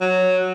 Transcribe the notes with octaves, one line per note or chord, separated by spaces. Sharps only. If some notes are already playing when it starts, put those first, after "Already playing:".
F#3